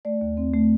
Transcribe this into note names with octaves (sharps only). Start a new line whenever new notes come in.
A3 D5
D#2
C4
A3